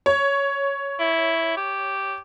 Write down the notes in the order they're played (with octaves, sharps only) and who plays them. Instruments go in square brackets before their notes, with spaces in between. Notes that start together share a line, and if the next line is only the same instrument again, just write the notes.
[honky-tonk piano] C#5
[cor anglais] E4
G4